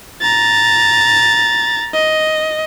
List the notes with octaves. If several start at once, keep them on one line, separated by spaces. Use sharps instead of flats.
A#5 A6
D#5